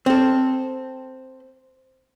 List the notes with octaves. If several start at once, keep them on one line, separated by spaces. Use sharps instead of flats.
C4 A4